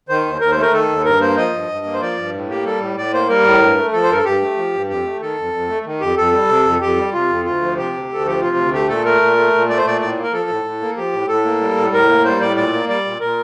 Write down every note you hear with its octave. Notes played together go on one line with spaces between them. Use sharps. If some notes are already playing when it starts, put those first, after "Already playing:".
D#3 C5
D#2
D#2 A#4
C5
A3 A#4
D#3 A4
D#2
G2 A#4
A#3 C5
F3 D#5
G2
G2
A#3
C5
F3 D5
G2
A2
A#3 G4
G3 A4
A2
A2 D5
A#3 C5
G3 A#4
A2
G2
A3
F3 A4
C5
G2 A#4
A4
G2 G4
A3
F3
G2
F2 G4
A3
D#3 A4
F2
F2
A3
D#3
F2 G4
F2 A4
G3
C3
F2
F2 G4
G3
C3 F4
F2
D2 F4
F3
C3 G4
D2
D2 A4
F3 G4
C3 F4
D2
A3 G4
A#2 A4
A3 A#4
A#2
A3
A#2
A3 D5
C5
A#2 D5
A2 D5
A#3
A#4
F3 A4
A2
A2
A#3
F3 G4
A2
A2 A4
A#3
G3
A2
A2 A#4
A#3
G3 C5
A2 D5
A#2 D5
A#3
G3 D5
A#2
A#2 A#4